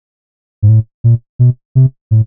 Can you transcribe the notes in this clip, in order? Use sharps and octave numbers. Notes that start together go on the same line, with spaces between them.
G#2
A2
A#2
B2
C3
A2